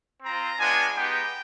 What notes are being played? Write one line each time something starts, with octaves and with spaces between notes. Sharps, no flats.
C4 F4 A#5
G#3 B3 D4 F4 G#5
G#3 B3 D#4 G4 G5